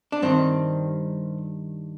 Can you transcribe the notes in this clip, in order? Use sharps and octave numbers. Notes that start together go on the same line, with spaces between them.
D4
G2 D#3 G3 C4